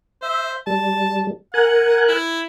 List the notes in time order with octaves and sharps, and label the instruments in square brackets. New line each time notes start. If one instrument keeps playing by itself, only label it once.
[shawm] C5 [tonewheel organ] E5
[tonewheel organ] G3 [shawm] A5
[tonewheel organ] A#4 G#5 F#6 [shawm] F#5
[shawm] E4